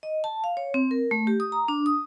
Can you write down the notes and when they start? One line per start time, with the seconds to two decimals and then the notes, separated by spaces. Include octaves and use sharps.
0.03 D#5
0.24 A5
0.44 F5
0.57 C#5
0.74 C4
0.91 A#4
1.11 A3
1.27 G4
1.40 D#6
1.52 A#5
1.68 D4
1.86 D#6